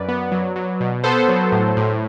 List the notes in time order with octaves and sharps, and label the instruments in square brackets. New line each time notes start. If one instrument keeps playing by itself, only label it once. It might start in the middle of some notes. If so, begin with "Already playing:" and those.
Already playing: [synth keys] F#2 B4 D5
B3
F#3
F#3
B2
B3 A4 C5
F#3
A2
A2